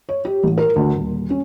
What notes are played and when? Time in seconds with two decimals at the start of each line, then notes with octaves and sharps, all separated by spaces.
0.09 C#5
0.25 G4
0.43 A1
0.58 A#4
0.76 D2
0.95 D#1
1.30 C#4